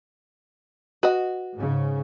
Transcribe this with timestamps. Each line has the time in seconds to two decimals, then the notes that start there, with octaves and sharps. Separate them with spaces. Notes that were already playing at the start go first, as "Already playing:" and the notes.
1.03 F#4 B4 D#5
1.56 G#2 C#3